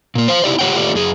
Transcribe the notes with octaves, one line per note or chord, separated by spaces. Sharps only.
A#2 A#3
C5 F5
D#4 E4 G4 D5
F4 G4 A4 C#5 F#5 G5
A3 F4 G4 D5
F#2 G#4